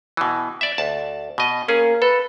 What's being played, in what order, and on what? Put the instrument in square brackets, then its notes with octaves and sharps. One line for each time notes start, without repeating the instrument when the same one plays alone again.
[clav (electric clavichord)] B2 E3
D5 E5
D2 A5
B2 D#5
[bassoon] A#3 [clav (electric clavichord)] C#4 G#4
[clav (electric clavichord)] A4 [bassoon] B4